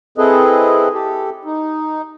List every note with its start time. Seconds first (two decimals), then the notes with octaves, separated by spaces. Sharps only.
0.18 C4 E4 G#4 A4 B4 D#5
0.94 G4 A4
1.45 D#4